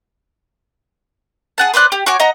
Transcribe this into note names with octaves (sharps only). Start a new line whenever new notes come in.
G#4 F#5 A5
B4 C5 D5 F#6
G4
F#4 C#5 G#5 D6
D#5 F#5 A#5